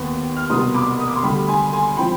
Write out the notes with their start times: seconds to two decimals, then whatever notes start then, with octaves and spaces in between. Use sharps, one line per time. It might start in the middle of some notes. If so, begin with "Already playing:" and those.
Already playing: D#2 D#3 B3
0.36 F6
0.50 C2 B2 B3 C6 D#6
0.74 B5 D6
1.00 D#6
1.08 D6
1.16 C6
1.23 D2 D3 G3 G5 B5
1.48 G#5 C6
1.73 G#5 C6
1.97 F3 C4 G5 B5